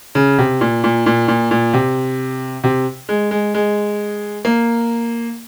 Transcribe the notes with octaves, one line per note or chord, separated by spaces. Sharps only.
C#3
C3
A#2
A#2
A#2
A#2
A#2
C3
C3
G#3
G#3
G#3
A#3